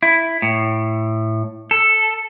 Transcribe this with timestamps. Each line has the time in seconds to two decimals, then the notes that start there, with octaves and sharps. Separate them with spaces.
0.03 E4
0.42 A2
1.71 A4